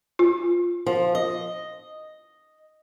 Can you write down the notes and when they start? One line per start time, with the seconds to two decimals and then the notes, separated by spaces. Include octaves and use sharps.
0.19 F4
0.86 F3
1.15 D#5